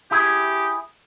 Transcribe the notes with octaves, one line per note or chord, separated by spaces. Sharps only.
E4 G4 G#4